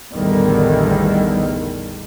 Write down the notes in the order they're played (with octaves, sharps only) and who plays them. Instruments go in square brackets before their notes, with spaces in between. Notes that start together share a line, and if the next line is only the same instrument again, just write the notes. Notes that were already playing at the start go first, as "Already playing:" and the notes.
[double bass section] A1 E2 D3 D#3 G3